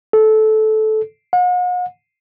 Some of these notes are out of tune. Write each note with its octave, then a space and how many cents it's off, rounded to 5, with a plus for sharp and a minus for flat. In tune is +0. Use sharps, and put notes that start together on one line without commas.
A4 -15
F#5 -45